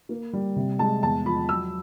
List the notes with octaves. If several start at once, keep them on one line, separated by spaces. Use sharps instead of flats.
A#3
G3
C3
G#3 A5
E2 A5
F3 B5
F#3 E6